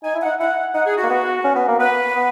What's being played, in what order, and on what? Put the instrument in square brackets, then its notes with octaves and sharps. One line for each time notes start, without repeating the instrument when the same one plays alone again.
[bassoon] D#4 [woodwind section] G#5
[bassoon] E4
[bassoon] D#4 [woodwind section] F#5
[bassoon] E4 [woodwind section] F#5
[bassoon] D#4 [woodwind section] F#5
[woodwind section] G#4
F#4
[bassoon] A#3
B3
C#4
B3
A#3
[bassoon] B3 [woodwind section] B4
[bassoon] B3